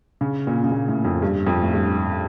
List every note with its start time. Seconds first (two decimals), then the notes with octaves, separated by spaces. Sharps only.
0.21 C#3
0.47 A#2
0.64 C#3
0.72 A#2
0.88 A2
1.05 F2
1.22 G2
1.47 F2
1.62 A2
1.73 G2